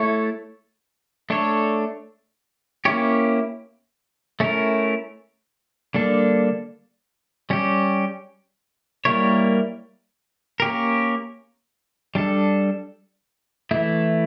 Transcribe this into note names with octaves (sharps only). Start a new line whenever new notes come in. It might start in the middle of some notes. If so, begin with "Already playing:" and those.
Already playing: A3 E4 A4 C#5
A3 D4 A4 C#5
A#3 C#4 E4 G4 C#5
A3 C#4 E4 A#4
D3 G3 A#3 D4 A4
G3 C#4 G4
G3 A#3 E4 A#4 C#5
A#3 C#4 G4 A#4
G3 D4 A4
E3 A3 E4